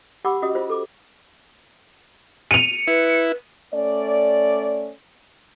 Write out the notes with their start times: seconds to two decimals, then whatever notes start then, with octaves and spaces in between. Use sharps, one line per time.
0.25 G4 F#5 B5 C#6 D6 E6
0.42 C#4 F#4 G4 D#5 D#6
0.55 F4 C5
0.70 A4 D6
2.51 C#7 D#7 F7
2.88 E4 B4
3.74 A3 C#4 D5